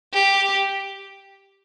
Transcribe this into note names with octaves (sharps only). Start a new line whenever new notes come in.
G4